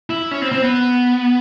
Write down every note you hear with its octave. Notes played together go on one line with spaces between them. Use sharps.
E4
C#4
C4
C4
B3